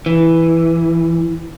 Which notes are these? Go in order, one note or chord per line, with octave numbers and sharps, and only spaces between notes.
E3